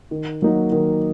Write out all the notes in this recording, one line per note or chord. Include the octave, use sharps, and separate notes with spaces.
D#3
F#3 A#3 D#4 F#4
D#3